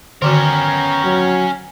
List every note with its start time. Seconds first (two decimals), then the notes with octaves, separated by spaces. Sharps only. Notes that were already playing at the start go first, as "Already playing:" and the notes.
0.22 D3 D#3 B3 C#4 F#4 A#4 G5 A#5
1.04 F#3